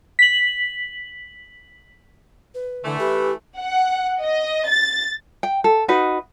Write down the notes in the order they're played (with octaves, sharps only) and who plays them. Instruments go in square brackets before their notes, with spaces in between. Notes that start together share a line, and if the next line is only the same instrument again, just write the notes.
[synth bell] B6 F#7
[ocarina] B4
[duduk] D3 [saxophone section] E3 A3
[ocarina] G4 [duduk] B4
[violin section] F#5
D#5
A6
[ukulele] G5
A4
D#4 F#4 B4 D#5